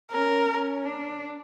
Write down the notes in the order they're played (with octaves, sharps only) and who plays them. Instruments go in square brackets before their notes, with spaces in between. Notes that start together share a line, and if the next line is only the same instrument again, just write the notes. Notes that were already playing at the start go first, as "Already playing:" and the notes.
[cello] C#4 [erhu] A#4
[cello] C#4
D4